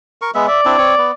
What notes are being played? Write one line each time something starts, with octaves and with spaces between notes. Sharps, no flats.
A#4 C#6
G#3 B3 E5
D5 E5
C4 D4 E4
C4 C#5
B3